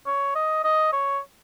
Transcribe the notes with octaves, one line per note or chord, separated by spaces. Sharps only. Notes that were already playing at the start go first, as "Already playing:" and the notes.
C#5
D#5
D#5
C#5